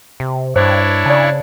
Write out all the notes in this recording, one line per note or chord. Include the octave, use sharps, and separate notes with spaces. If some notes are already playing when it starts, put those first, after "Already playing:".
C3
G2 D4 E4 C5 C#5
C#3 D5 A5